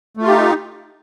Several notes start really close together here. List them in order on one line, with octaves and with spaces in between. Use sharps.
A3 F4 G4 D#4